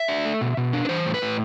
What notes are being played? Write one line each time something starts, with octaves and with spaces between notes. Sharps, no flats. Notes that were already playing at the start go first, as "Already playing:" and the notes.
Already playing: E5
D4
A3
B2
B2
D4
B4
E3 C5
A2
B4
A2